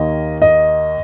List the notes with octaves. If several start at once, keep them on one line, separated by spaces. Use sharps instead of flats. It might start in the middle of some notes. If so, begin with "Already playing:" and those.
Already playing: D#2 D#3 A#3 D#5
D#5